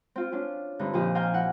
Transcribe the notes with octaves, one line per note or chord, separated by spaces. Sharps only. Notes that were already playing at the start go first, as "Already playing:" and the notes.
C4 F4
C#4 D4 F4
G2 D3 C4 D#4
A#2 F3 G4 D#5
D#5 F5 G5 G#5 A#5 C6
E4 F#5